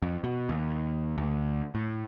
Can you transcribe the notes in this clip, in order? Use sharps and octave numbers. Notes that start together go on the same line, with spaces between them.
F2
B2
D#2
D2
A2